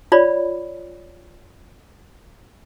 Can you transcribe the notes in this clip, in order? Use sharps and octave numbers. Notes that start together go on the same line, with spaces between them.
F4 C#5 D5 B5